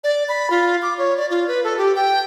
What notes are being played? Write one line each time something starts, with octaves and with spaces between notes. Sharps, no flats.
D5
B5
F4
D6
C#5
D5
F4
B4
A4
G4
G5